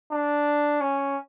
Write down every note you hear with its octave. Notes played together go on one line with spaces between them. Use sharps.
D4
C#4